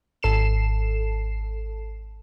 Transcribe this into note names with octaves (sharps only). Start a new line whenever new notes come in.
G#1 A4 C7 E7